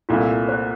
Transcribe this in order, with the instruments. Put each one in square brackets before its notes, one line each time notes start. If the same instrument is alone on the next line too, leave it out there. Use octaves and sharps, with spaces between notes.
[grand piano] C2 A#2 A3 E4 [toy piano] F4
[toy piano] C5